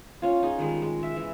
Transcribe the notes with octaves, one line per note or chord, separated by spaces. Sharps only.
C#4 F4
D#4 G#4
D#3 G3 G#3
G#3
E5
E3